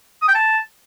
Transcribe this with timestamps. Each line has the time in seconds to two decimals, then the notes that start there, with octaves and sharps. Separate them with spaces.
0.22 D#6
0.28 G5
0.35 A5